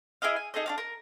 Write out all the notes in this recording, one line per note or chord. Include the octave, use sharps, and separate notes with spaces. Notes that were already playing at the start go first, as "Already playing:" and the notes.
E4 G#4 D#5 F5
G#5
D#4 G#4 A4 D#5
D4 F#4 F5
A#4